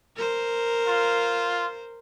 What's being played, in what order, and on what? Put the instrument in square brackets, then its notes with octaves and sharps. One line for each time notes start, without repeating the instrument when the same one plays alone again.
[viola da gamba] A#4 C5
[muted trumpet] F4